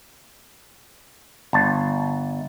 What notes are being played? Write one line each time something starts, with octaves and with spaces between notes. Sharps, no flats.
G1 A5